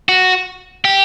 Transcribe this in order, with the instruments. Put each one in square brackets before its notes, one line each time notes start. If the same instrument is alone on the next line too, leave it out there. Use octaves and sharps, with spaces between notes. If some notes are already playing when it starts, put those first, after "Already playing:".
[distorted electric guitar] F#4
G4